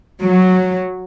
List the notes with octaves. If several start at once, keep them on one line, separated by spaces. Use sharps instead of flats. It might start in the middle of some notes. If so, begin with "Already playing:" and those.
F#3